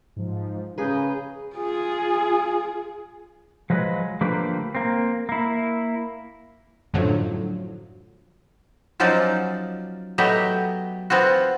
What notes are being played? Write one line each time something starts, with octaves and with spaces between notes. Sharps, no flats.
G#2 F3
C#3 G#4 B4 A#5 D#6 G6
F4 G#4
F3 F#3 G#3 B4
D3 F3 A3 A#3 G4 B4
A#3 C4
A#3 E4
F#2 A2 D3 F3 F#3
F3 F#3 C#4 D#4 F4 D5
F#3 A3 B3 G4 D#5
B3 C4 F4 F#4